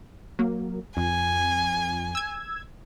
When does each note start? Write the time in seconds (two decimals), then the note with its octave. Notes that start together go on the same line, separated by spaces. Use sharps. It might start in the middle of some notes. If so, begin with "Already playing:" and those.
0.39 F#3 A#3
0.97 F2 G#5
2.15 E6 G#6